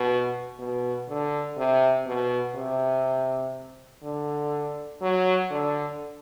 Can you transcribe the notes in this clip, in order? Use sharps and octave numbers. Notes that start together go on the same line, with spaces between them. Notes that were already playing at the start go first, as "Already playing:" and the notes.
Already playing: B2
B2
D3
C3
B2
C3
D3
F#3
D3